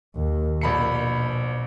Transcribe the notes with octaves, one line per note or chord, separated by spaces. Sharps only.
D#2
A#1 B2 B5 C#7